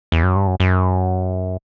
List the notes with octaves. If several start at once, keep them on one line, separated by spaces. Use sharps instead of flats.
E2
F#2
G2
F#2
F#2